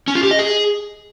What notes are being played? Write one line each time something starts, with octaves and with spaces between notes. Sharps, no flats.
C#4
F4
G4
D#5
G#4